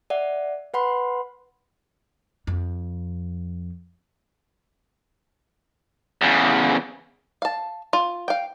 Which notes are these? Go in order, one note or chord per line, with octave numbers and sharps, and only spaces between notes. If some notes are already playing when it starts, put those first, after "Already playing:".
D5 E5 F#5
B4 F#5 B5 C6
F2
E2 C#3
F5 A5
F4
F5 G5